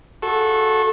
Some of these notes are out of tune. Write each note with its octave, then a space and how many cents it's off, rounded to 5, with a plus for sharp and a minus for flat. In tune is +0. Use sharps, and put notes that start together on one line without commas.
F#4 +0 A4 -5 C#6 -35